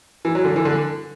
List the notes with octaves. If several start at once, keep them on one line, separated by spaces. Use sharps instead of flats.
E3
F#3
D3
E3
D3